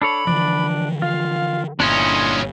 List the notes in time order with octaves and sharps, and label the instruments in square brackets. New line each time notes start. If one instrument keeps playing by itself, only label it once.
[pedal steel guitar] D4 A4 C#5 [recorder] B5
[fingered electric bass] D3 E3 F3 [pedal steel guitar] D4 D5
[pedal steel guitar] F4 [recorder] F5
[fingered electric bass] G1 [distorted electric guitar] A#2 C#4 [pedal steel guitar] D4 E4 D#5 [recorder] C6